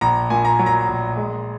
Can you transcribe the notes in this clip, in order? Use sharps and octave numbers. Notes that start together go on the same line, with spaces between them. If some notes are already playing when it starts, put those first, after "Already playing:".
A#1 A#5
A#2 G#5
A#5
F#3
A#5
A#1
G#3